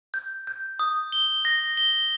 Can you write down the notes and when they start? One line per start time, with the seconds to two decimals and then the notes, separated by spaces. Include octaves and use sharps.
0.14 G6
0.47 G6
0.79 D#6
1.12 G7
1.45 A#6
1.77 G7